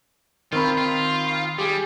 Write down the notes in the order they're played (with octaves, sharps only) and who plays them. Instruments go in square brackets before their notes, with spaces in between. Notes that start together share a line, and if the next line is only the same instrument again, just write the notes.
[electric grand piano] D#3 C4 B5 [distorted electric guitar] F4
[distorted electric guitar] F4
[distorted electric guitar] G3 [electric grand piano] G4 G#4